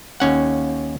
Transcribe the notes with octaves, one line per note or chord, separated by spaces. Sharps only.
D#2 C#4 F#5